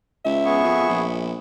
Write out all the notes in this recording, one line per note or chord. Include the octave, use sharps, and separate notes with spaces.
C#2 E5
B3 G#4 C#6
F2
A#1